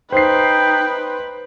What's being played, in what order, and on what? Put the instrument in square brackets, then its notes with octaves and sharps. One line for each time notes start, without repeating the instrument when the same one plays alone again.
[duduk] D#4 [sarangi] B4 [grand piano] C5 C7 [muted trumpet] G5